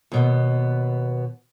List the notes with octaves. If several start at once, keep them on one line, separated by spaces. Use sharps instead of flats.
D#2 B2 B3